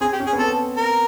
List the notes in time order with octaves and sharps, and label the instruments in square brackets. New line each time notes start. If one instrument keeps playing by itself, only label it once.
[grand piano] C4 [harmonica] G#4
[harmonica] G4
[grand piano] C#4
[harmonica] G#4
[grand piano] B3
[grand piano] C4 [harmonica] A4
[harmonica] A#4